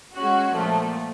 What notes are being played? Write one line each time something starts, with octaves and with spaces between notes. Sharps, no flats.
G#3 C#4 F#4
A#2 F3 A3